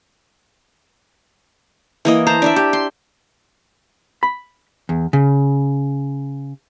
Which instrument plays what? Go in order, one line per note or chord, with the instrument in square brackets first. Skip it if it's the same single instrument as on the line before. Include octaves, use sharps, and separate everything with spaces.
[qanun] E3 A#3 D#5
C5 A5 A#5
D4 D5 E5
G4
C6
[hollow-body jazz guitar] B5
E2
C#3